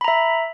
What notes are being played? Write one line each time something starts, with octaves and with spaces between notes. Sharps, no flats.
E5 A#5 B5